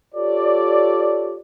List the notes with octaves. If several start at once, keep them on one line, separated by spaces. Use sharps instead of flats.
F4 G4 A4 C#5 D5